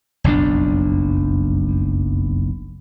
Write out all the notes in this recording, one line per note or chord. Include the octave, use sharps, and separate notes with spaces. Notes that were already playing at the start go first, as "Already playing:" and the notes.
F#1 B1 F2 D4